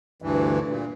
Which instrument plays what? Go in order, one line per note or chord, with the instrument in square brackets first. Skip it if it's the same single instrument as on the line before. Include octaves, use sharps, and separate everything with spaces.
[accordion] D2 G2 E3
A#2